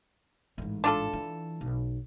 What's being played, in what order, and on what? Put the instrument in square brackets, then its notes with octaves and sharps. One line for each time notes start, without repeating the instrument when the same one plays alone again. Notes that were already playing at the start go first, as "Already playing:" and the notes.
[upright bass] A1 G#2
[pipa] D4 F4 A4
[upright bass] E3
B1